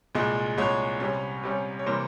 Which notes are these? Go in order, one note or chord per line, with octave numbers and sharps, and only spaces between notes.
C2 A#2 G#3
C2 A#2 G#3 C#5
C3 G3 C#4
C3 G3 C#4
C#5
C3 E3 G3 A#3 C5